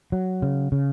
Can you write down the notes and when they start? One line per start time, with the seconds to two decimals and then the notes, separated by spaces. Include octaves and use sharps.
0.12 F#3
0.42 C#3
0.72 C#3